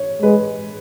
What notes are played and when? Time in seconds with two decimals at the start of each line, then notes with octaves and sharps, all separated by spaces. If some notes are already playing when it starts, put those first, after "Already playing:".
Already playing: C#5
0.22 G#3 B4